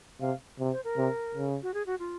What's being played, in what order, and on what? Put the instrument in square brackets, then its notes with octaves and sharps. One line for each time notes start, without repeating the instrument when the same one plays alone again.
[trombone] C3 [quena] F5
[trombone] C3
[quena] C5
A#4
[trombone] C3
C#3
[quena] F#4
G#4
F#4
F4